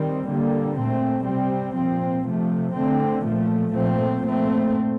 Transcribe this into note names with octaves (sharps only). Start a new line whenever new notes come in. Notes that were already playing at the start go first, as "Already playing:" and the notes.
Already playing: D#3 G3 C4
D3 G3 A#3
A#2 A3 C4
C3 G3 C4
A#2 F3 C4
C3 F3 A3
D3 A3 C4
A#2 F3 A3
A#2 F3 A3 C4
A#2 A3 C4